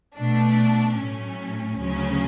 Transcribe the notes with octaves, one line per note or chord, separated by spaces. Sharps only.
B2 A3 D4
A2 F#3 A3 C#4
D2 C#3 F#3 C#4